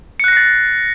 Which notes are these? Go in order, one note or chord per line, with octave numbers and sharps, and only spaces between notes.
F#6 A6 A#6 C7 C#7